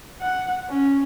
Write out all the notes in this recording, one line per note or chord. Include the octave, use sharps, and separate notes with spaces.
F#5
C#4